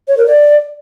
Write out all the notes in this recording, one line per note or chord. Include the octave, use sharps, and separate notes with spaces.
C#5
A#4
D5